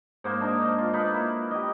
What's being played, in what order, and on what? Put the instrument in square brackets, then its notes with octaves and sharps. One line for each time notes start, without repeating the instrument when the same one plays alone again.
[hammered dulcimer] G#2 A#3 C5
D4 A#4 C5 D#5
F4
A#3 D#4 A#4 B4
E4
G4 D#5